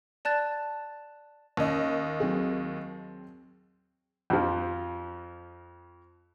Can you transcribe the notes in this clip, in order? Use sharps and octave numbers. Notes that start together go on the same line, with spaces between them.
D5 A5 F#6 A6
D#2 C#4 D#5
F#3 C4 G#4
F2 F3